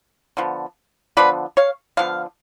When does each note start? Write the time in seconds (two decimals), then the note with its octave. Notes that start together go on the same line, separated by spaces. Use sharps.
0.37 D3 F3 B3
1.17 D3 F3 B3 B4 D5
1.57 C#5 F5
1.97 D3 F3 B3 F5